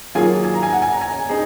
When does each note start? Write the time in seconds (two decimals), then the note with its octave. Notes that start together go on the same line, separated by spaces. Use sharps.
0.15 D#3 F#3 A#3 F4 G#4 G#5
0.44 G#5
0.54 A#5
0.63 G#5
0.73 F#5
0.82 G#5
0.92 A#5
1.01 G#5
1.29 C4 D#4 G#4